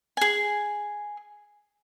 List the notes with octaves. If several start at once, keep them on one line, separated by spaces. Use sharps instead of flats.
G#4 G#5